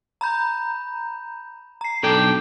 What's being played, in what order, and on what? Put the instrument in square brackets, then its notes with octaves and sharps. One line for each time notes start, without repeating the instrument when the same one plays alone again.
[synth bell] A#5 B5 G6
A#5 C7
[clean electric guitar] B1 D4 G5 [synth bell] A4